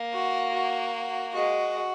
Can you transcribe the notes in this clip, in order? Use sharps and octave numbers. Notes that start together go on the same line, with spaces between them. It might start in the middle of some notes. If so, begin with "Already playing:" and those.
Already playing: A#3
F#4
F#4
G#3 F#4